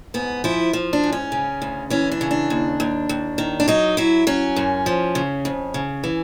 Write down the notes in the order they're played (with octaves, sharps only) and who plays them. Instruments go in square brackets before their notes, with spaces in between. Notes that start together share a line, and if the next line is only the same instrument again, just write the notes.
[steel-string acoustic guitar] G#2 B3
F3 E4
F3
D4
G#2
C#4
C#3
D2
E3 C#4
D4
C#3
D4
D#2
D#2
D#2
D#3
D4
F#3 D#4
F#3 E4
F#3 C#4
F#2
F3
C#3
F2
C#3
E3